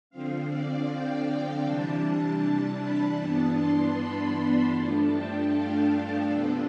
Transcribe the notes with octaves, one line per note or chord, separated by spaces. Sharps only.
D3 F3 C4 F5
D5
G5
G5
C3 E3 G3 D4 A5
B5
G2 E3 B3 D4 A5
C6
B5
G2 F3 A3 D4 A5
G5
F5
C3 F3 B3 D4 A4